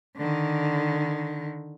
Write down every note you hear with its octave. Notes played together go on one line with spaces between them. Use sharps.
D3 D#3